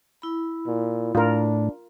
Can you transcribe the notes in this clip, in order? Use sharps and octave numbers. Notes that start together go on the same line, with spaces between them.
E4 B5
A#2
A2 D4 F4 A#4